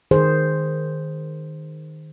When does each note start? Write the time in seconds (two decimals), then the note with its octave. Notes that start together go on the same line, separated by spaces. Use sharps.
0.11 D#3 G#4 C5